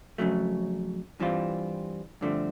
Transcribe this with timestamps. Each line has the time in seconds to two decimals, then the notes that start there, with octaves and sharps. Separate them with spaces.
0.18 F2 C#3 F#3 A3
1.20 G2 E3 G3 C4 F4
2.21 G2 D3 F3 A3 C4